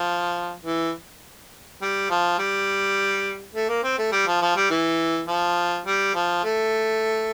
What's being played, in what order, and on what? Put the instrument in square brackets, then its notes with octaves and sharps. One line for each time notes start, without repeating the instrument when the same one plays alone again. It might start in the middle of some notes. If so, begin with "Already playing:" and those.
Already playing: [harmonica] F3
E3
G3
F3
G3
A3
A#3
C4
A3
G3
F3
F3
G3
E3
F3
G3
F3
A3